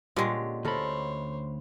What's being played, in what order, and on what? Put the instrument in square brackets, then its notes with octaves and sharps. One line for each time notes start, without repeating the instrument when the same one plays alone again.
[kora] A#2 G3 C#4 [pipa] D3 G#3
[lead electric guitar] D2 B5 [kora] A4 A#4 [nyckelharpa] C5 C#5